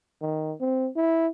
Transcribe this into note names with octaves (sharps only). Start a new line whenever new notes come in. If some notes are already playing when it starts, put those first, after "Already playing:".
D#3
C4
E4